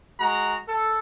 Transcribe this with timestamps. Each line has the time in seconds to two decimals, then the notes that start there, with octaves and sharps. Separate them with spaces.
0.20 G#3 F#4 A#5
0.68 A4